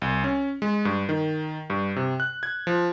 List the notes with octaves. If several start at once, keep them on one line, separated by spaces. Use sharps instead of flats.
C2
C#4
G#3
G2
D#3
G2
C3
F#6
G#6
F3